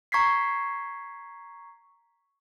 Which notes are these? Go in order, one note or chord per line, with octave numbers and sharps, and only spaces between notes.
A#5 C#6 G#6 B6 C7